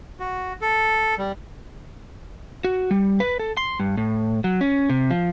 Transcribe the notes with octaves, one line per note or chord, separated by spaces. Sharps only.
F#4
A4
G3
F#4
G3
B4
A4
C6
G2
A2
F#3
C#4
C3
F3